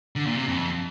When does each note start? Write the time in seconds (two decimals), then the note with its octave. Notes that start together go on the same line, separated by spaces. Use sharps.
0.16 D3
0.26 A#2
0.37 C3
0.48 F2